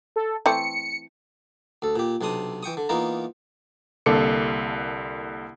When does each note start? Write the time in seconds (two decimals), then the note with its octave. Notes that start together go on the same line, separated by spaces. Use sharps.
0.16 A4
0.46 E3 A3 C4 C#7
1.82 D2 A4
1.96 A#2 G4
2.21 B1 C3 D4 C6 D#6
2.63 E3 G5 C#6 D#6
2.77 D3
2.89 E3 A#3 B3 D#4 F4 A#4
4.06 C2 D3 A#3 A4 D6 C#7